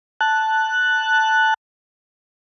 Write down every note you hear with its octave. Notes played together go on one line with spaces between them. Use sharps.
A5 F#6